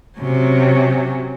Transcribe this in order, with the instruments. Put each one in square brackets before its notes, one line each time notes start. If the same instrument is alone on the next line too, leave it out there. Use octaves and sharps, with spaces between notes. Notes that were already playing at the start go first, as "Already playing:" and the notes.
[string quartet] C3 F#3 C#4